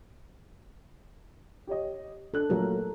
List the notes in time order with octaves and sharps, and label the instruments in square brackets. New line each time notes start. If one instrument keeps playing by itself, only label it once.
[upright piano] G4 C#5 D#5
[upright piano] D4 F#6 [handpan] A4
[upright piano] A#2 F#3 A3 [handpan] A#4